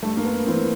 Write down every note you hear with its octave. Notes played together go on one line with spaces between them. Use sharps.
G2 A3
A#3
B3
E3 C4